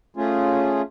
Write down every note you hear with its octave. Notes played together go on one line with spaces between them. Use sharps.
A3 C#4 F4 G#4